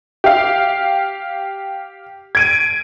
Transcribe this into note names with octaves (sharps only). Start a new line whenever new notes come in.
G4 F5
G#6 D7 D#7